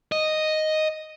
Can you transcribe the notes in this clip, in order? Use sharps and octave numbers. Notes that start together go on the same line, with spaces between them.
D#5